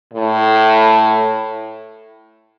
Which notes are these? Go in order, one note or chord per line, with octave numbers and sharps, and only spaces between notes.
A2